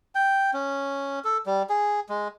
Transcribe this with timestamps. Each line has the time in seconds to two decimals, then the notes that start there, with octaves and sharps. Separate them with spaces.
0.15 G5
0.53 C#4
1.24 A4
1.46 G3
1.70 G#4
2.09 G#3